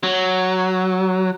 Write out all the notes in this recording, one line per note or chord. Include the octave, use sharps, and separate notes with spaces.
F#3